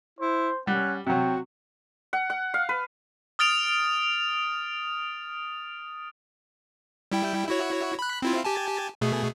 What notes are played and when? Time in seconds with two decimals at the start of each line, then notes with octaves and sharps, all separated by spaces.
0.19 E4 C5
0.67 G3 C#4 F#5
1.07 C3 F#3 F#4 G5
2.13 F#5
2.30 F#5
2.54 F5
2.69 B4
3.39 D#6 F6 A6 D7 F7
7.12 G3 E4 G5
7.49 E4 F#4 C#5
7.99 B5 F#6
8.22 C4 E4 F4
8.45 G4 G#5 A5
9.01 B2 A3 G#4